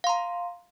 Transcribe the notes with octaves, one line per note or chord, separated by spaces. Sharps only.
F5 A#5 C6